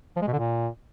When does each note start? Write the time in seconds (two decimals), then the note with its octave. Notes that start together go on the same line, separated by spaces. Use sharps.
0.16 F3
0.22 G#3
0.28 B2
0.33 D3
0.39 A#2